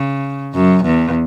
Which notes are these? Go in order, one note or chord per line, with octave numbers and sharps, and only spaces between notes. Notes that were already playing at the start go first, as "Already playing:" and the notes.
Already playing: C#3
F#2
E2